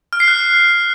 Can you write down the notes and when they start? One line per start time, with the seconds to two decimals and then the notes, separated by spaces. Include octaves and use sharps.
0.13 F6
0.20 C7
0.28 F#6